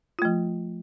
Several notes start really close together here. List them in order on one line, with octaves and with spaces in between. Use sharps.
F4 A3 F3